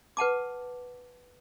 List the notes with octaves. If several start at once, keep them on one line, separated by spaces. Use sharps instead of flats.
B4 F#5 A5 D6